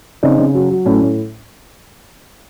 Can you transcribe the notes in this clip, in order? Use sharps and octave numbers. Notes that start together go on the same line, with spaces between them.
C#3 C4 D#4
C#3
F#3
F#3
A2 C#4
A2